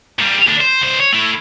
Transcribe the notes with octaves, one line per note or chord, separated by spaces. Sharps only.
A#2 G3
D2 D4
C5
C#2 C5
C#5
A3 E4